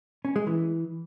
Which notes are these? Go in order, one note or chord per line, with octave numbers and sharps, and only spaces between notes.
C#4
G#3
E3